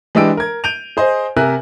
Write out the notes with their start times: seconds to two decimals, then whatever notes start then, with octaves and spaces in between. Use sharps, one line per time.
0.15 E3 G#3 D4 G4 E6 D7
0.37 A#4 G#6
0.64 G6 D7 D#7 F7
0.97 G#4 C5 D#5
1.36 C3 A#4 E5 G#5 F#6